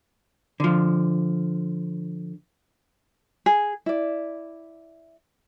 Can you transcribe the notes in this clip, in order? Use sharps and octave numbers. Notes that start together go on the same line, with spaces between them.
D3 F3
G#4
E4 D5